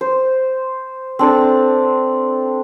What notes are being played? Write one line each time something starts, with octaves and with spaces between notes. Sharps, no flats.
C5
C4 D4 A4